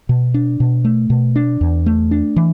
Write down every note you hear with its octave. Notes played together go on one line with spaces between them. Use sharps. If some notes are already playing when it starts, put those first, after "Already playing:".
B2
D4
B2
A3
B2
D4
E2
A3
D4
E3